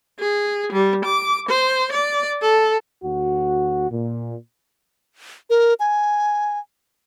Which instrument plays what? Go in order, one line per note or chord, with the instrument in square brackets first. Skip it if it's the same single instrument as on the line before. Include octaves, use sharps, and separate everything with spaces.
[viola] G#4
G3
D6
C5
D5
A4
[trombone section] D2 F#4
A#2
[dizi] A#4
G#5